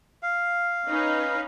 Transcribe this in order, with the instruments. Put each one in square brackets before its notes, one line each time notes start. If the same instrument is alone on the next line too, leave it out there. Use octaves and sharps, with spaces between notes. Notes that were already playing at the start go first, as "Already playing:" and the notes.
[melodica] F5
[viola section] C#4 D#4 B4